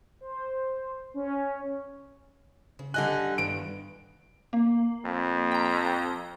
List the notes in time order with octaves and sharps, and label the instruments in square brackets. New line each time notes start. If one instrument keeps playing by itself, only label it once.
[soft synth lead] C5
C#4
[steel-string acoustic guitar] C#3
[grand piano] D3 F#6 [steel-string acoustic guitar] G3 D#5 G#5
[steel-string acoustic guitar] E2 G2 D#3 [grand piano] D7
[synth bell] A#3
[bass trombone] F2
[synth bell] G5 A#5